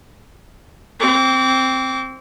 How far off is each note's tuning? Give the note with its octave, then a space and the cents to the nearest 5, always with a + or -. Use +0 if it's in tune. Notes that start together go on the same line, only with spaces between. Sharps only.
C4 +5 D6 -35